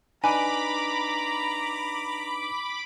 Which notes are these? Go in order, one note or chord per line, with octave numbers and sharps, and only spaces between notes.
D4 D#4 B4 G#5 A#5 B5 D6